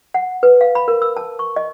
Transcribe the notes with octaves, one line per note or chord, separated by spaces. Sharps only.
F#5
B4
F5
B5
A#4
E6
A5
C#6
D#5